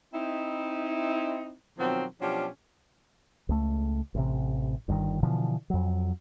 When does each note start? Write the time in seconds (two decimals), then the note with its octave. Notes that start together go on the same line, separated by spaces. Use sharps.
0.13 C4 D#4 E4
1.78 B2 D#3 F3 F#3 C4
2.20 B2 F3 F#3 C#4 D4 G4
3.49 C#2 A3
4.15 A1 C3
4.88 G1 G2 C3 D#3
5.23 B2 D3 E3 F3
5.70 F2 F#3